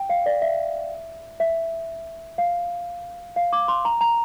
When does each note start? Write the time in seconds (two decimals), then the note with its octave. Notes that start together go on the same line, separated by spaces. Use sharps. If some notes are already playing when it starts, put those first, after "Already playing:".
Already playing: G5
0.10 F5
0.26 D5
0.42 E5
1.40 E5
2.38 F5
3.36 F5
3.53 D6
3.68 C6
3.85 A#5
4.01 A#5